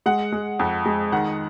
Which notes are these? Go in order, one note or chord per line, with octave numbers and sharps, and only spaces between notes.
G#3 F#5
G#3
F2
G#3
D#3 F#5